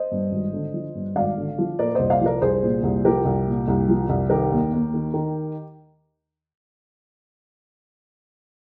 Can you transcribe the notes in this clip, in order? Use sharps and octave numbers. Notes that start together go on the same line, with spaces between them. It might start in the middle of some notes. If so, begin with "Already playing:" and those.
Already playing: C5 D#5
G2
G#1
D3
F3
G2
G#1 D5 F5
D3
F3
A#2 A#4 D5
C2 C5 D#5
D5 F5
F3 A#4 D5
C2 G#4 C5
A#2
C2
F3 G4 A#4
C2
A#2
C2
F3
C2
D#3 G4 A#4
D#2
D#2
D#3
D#3